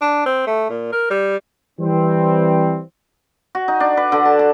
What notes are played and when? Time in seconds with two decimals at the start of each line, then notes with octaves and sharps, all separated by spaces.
0.02 D4
0.26 C4
0.47 A3
0.70 A#2
0.92 A#4
1.10 G3
1.79 E3 G3 C4
3.55 F#4
3.68 D#4
3.80 D4
3.97 B4
4.12 D3
4.25 A5
4.39 A5